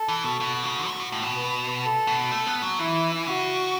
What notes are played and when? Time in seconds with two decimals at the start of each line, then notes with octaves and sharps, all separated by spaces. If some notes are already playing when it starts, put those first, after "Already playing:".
Already playing: A4
0.08 E3
0.24 B2
0.40 B2 F#4
0.63 C#3
0.88 A3
1.00 A2
1.12 A2
1.23 B2
1.36 B4
1.83 A4
2.07 B2
2.32 A3
2.46 B3
2.63 F#3
2.79 E3 E4
3.26 C#3 F#4